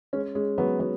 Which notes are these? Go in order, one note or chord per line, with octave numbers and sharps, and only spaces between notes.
G#3 C#4
G#3 C#4
F#3 B3
F#3 B3